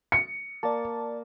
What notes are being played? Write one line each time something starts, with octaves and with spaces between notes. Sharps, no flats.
C#7
A#3 D5 A5